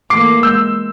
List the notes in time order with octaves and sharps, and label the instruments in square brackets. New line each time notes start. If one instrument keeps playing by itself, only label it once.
[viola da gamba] E3 A3 A#3 [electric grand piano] D6 C7
[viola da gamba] G#3 [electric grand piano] E6 G6